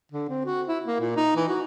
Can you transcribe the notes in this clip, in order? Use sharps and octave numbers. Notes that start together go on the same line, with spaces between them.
D3
C4
F#4
E4
A#3
A#2
D#4
E3
F#4